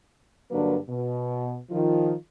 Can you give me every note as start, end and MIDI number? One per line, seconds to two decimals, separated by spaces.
0.51 0.77 43
0.51 0.77 50
0.51 0.77 54
0.51 0.77 58
0.51 0.77 62
0.51 0.77 71
0.89 1.56 47
1.71 2.12 51
1.71 2.12 53
1.71 2.12 65